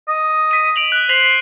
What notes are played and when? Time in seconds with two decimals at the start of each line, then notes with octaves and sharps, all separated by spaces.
0.08 D#5
0.51 B6 D#7
0.76 D7 F7 F#7
0.92 F#6
1.09 C5 B6 F7 F#7